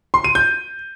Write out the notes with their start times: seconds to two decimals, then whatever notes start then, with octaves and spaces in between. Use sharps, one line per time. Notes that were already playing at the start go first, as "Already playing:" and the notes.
0.14 C6
0.24 D#7
0.35 G6